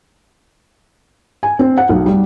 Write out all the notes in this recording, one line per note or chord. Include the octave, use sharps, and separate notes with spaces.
G#5
C4
F#5
B1
G3